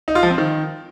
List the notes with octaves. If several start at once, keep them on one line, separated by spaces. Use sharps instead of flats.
D#4
F4
F3
C4
D#3